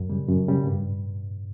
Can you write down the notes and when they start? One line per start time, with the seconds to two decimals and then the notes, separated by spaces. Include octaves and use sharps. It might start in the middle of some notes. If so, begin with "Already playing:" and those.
Already playing: F#2
0.10 C#3 G3
0.28 F#2
0.48 C#3 G3
0.67 G2